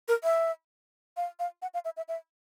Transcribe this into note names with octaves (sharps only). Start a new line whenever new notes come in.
A#4
E5
F5
F5
F#5
F5
E5
E5
E5